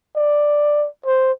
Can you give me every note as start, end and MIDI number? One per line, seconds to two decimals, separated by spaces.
0.16 0.87 74
1.06 1.32 72